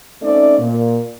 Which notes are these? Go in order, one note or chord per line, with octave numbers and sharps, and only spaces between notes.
A3 C4 C#4 D#4 D5
A#2